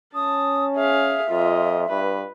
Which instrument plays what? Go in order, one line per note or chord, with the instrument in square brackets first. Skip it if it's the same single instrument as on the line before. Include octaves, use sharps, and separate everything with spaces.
[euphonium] C#4 [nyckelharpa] A5 [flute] D#6
[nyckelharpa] G#4 F5 [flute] E5
[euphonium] F2 [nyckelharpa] F4 D#5
[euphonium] G2 [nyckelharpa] B4